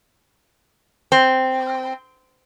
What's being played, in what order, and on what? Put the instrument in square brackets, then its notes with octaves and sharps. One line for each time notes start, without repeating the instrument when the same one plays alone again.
[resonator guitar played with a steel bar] C4